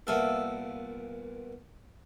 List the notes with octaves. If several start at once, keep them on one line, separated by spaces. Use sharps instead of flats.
C2 A#2 B3 A4 E5 F5